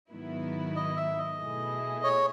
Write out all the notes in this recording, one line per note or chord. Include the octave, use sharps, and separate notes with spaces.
G#2 D#3 F#3 B3 E4
D#5
E5
D#5
B2 A3 E4 G#4
C#5